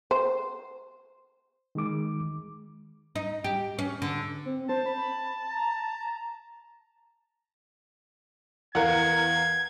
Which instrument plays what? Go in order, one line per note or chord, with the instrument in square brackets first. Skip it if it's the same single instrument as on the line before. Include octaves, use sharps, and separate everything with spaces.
[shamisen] C5
[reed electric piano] D#3 G#3 D6
[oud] D#4
G4
C#4
D3
[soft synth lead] C4
[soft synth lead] C5 [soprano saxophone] A5
[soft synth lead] B5
A#5
[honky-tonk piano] E2 A#4 [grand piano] F5 F#5 [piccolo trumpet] G#6